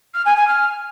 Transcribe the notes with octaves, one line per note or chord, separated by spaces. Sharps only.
F6
G#5
G#5
F6